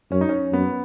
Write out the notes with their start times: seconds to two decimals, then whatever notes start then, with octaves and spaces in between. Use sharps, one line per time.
0.11 F#2 C#4
0.21 D#4
0.29 C#4
0.53 F#2 B3